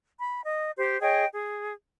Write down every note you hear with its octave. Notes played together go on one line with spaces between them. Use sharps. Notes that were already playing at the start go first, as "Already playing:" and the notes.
B5
D#5
G4 C5
G#4 C#5 D#5 G5
G#4